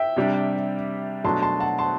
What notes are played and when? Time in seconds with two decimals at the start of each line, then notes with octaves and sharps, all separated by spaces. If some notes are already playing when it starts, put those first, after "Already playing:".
Already playing: E5 G5
0.16 C3 G3 D4
1.24 B2 F#3 A3 D4 A5 C6
1.42 A5 C6
1.60 F#5 A5
1.79 A5 C6